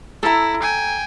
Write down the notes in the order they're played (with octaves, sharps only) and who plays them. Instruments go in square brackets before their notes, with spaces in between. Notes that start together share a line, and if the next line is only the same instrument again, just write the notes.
[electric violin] E4 [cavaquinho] A4 A#5
[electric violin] G5 G#5